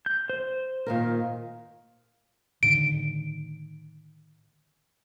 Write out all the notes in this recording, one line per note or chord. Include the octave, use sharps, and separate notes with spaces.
G6
C5
A#2 D#3 A#4
A2 D3 D#3 D7